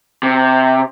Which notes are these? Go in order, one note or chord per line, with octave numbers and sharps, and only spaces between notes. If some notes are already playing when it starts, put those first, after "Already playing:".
C3